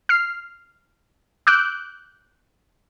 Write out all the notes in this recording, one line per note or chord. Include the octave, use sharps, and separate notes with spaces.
F6 C7
D6 E6 F#6 G6 D7